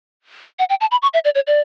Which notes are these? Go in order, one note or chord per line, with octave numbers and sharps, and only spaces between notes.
F#5
G5
A5
B5
C#6
E5
D5
C#5
D5